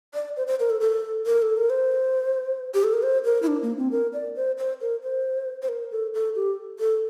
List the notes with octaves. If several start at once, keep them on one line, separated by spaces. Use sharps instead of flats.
D5
C5
C5
A#4
A4
A4
A#4
A4
A#4
C5
G4
A4
A#4
C5
A#4
E4
D4
A#3
C4
A#4
D5
C5
C5
A#4
C5
C5
A#4
A4
A4
G4
A4